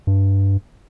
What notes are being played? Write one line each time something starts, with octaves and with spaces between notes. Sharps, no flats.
G2